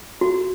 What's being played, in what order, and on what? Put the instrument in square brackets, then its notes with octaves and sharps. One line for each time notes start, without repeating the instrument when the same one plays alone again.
[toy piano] F#4